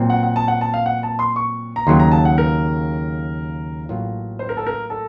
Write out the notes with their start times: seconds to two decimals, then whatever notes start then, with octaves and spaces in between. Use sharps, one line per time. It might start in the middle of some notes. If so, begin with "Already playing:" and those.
Already playing: A#2 F#3 C4
0.10 F#5
0.23 F#5
0.36 A5
0.48 F#5
0.61 A5
0.74 F5
0.86 F#5
1.03 A5
1.19 C6
1.36 C#6
1.76 A#5
1.87 D#2 C#3 F#3 A#3 C6
2.00 A#5
2.12 A5
2.25 F#5
2.38 A#4
3.89 A1 A2 F#3 A#3 F4
4.39 C5
4.49 A#4
4.57 A4
4.66 A#4
4.90 A4